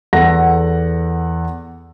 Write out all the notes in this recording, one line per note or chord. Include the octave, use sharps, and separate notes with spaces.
E2 A4 F#5 A#6